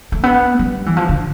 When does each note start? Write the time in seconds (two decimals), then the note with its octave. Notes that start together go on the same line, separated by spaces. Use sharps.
0.12 A3
0.23 B3
0.59 G3
0.86 E3
0.97 F3
1.09 D3